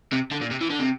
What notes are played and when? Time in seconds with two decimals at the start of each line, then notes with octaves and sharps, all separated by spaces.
0.12 C3
0.31 D3
0.41 A#2
0.51 C3
0.61 E3
0.70 D3
0.79 C3